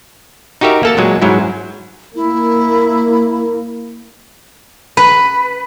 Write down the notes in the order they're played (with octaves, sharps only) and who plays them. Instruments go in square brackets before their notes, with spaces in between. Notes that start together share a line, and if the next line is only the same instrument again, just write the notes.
[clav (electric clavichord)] D#4 F#4 G4 A#4 E5
A#3 A4 A5
A#2 F#3 G#3
G#2 F#3 E4
[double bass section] A#3 [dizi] E4
[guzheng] B4